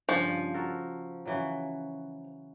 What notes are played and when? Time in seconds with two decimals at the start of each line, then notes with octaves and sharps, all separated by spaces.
0.09 G2 C#3 F3 G5
0.54 F#4 A4 A#4
1.26 C#3 E3 F#3